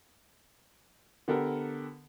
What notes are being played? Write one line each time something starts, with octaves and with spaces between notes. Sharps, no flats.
D3 B3 G4 A4 A#4